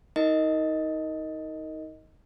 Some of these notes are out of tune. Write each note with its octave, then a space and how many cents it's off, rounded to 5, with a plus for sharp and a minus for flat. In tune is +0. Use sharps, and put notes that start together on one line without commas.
D#4 +25 A#4 -25 D#5 +5